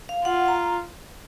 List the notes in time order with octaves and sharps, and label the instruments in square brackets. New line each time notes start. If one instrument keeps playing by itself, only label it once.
[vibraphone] F5
[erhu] F4 [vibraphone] F#5
[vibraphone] A#5